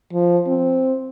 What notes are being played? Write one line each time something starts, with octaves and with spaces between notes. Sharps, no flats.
F3
C4